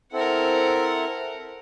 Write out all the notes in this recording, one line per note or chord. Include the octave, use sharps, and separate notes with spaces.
C4 E4 A4 A#4 F#5